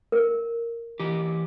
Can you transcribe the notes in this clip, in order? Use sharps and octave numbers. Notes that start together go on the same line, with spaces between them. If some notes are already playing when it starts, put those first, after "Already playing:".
A#4
E3 G4